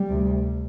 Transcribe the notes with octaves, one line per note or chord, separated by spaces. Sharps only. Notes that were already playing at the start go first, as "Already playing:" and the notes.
Already playing: G3
D2 C3